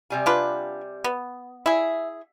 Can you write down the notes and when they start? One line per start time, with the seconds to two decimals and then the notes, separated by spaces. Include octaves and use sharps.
0.10 C3 G3 G#5
0.26 D4 F4 B4
1.04 B3
1.66 E4 G#4 E5